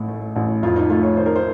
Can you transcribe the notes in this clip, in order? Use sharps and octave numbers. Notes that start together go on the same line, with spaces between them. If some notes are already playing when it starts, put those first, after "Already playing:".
Already playing: A1 A2
A3
A1
F2 F4
D#4
A3 F4
C#5
D#3 C5
A#4
C5